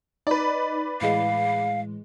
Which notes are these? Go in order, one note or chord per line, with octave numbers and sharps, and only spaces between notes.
D#4 B4 D5
A2 E3 G#3 F5